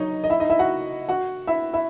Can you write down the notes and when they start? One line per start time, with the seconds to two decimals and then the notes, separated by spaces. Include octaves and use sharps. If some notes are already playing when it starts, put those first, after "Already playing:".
Already playing: F#3 D#4 C#5 D#5
0.24 D#5
0.30 E4 E5
0.40 D#4 D#5
0.50 E4 E5
0.59 F#4 F#5
1.09 F#4 F#5
1.47 E4 E5
1.73 E4 E5